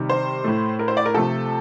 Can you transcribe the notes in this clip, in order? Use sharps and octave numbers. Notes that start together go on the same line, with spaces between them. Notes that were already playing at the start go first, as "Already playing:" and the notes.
Already playing: C3 D#3 G3
C5
A2 A3
A#4
C5
D5
A#4
C3 F3 A3 A4